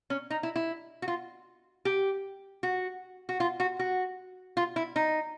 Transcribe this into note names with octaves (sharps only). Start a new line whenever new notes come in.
C#4
D#4
E4
E4
F#4
F4
G4
F#4
F#4
F4
F#4
F#4
F4
E4
D#4